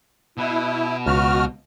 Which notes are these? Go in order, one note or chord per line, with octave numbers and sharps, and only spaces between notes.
B2 E4
C#2 F#4 F6